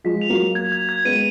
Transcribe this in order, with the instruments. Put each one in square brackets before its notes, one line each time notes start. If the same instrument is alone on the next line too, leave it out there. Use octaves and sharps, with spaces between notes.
[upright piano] F3 G#3 [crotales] B6
[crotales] F7
[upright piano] F#3 A#3
[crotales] F7
G#6
G#6
G#6
[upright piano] G#3 B3 [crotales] D#7